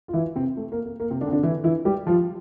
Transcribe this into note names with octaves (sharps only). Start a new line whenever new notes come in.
F4
E3 E4
C3 C4
A3
A#3
A#3
A#3
C3 C4
D3 D4
C4
D3 D4
E3 E4
E3 E4
G3 G4
F3 F4